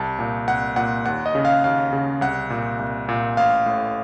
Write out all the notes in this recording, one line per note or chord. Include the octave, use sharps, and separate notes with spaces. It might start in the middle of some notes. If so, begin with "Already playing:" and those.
Already playing: C2 A5
A#2
C2 F#5
A#2 F#5
D#2 F#5
D#5
C#3
F5
D#2 F5
C#3
C2 F#5
A#2
C2
A#2
A1 F5
A2